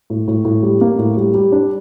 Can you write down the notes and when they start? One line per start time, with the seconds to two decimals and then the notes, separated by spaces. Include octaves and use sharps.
0.10 A2
0.28 A2
0.45 A2
0.63 G3
0.81 A#3
0.98 A2
1.17 G3
1.34 G3
1.52 D4